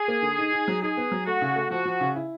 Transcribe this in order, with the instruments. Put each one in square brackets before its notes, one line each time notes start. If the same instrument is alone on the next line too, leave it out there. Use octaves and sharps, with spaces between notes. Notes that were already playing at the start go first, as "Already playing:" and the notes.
Already playing: [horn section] G#4
[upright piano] A#3
D3
D#4
D#4
F#3
[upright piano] D#4 [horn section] G#4
[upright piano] B3
F#3
[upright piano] A3 [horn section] F#4
[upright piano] C#3
A3
[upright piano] F3 [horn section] F#4
[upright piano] F3
C#3
E4